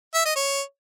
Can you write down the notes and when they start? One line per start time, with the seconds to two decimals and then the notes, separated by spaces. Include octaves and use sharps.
0.14 E5
0.25 D#5
0.36 C#5